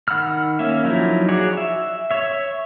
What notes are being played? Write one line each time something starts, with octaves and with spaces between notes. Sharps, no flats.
D#3 F#5 B5 E6 F6
A#3 C#4 E5
F3 F#3 D#4 E4
F#4 G#4 C#5 D5
E5
C#5 E5